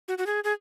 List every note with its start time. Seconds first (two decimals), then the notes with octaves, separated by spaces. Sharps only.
0.08 F#4
0.18 F#4
0.26 G#4
0.44 G#4